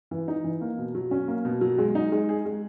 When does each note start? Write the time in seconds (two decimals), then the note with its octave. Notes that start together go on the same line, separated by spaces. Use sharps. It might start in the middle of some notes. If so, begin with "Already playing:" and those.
0.11 E3
0.28 D#4
0.44 E3
0.61 A#3
0.78 B2
0.95 F#3
1.11 C#4
1.28 A#3
1.45 B2
1.61 F#3
1.78 G#3
1.95 D#4
2.12 G#3
2.29 G#4
2.46 G#3